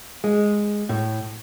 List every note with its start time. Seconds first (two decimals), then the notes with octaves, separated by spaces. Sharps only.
0.24 G#3
0.89 A2